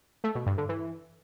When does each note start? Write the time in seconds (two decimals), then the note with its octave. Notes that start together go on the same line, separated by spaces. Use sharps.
0.24 A3
0.35 B2
0.46 G2
0.58 D3
0.69 E3